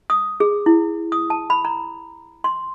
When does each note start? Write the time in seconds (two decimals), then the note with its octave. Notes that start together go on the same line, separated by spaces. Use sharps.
0.10 D#6
0.40 G#4
0.66 E4
1.12 D#6
1.30 A5
1.50 B5
1.65 A#5
2.44 C6